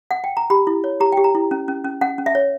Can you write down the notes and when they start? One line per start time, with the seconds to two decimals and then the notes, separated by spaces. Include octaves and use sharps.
0.11 F#5
0.24 G5
0.37 A#5
0.50 G4 B5
0.67 E4
0.84 C#5
1.00 G4 A#5
1.12 G4 G5
1.24 A#5
1.35 E4
1.51 C#4
1.68 C#4
1.85 C#4
2.01 C#4 F#5
2.18 C#4
2.26 E5
2.35 C#5